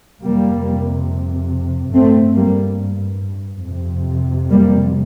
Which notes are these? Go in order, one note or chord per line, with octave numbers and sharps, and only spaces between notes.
F2 C3 G3 A#3
G2 A3 C4
G3 A#3
F2 C3
G3 A#3